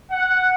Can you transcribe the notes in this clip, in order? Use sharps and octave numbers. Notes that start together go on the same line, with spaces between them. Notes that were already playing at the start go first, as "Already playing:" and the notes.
F#5